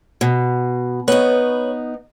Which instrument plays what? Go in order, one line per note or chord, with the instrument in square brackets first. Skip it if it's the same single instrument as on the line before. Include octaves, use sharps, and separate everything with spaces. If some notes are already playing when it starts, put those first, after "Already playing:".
[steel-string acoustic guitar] B2
[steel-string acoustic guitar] B3 D#4 [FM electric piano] B4 C#5